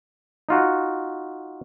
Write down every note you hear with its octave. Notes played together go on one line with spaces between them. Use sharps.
D#4 F4 F#4